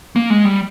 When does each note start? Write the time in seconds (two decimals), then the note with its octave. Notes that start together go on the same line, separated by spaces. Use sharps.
0.16 A#3
0.30 G#3
0.45 G3